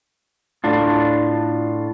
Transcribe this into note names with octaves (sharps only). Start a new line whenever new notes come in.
A2 D4 F4